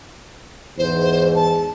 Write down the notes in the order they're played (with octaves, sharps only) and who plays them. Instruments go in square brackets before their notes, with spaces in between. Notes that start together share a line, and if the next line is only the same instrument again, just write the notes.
[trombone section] E2 G#2 [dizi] C5
[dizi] A5